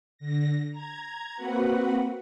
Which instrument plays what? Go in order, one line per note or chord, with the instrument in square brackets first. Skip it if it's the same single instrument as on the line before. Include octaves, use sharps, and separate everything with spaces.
[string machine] D3 A#6
A#5 G#6
A#3 C4 F#4 B4 F#5